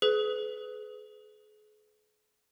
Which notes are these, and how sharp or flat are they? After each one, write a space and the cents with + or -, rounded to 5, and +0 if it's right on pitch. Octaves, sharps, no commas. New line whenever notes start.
G#4 +40 B4 +25